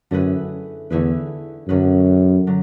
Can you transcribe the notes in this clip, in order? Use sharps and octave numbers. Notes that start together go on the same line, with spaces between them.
F#2 D3 A3 E4 G#4 B4
E2 D3 A3 E4 G#4 B4
F#2 D3 F#3 C#4 G#4 B4
D3 F#3